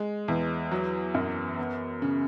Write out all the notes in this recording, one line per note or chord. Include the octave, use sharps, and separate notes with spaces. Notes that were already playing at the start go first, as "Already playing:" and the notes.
Already playing: G#3
E2
F#3
F#2
B3
C#3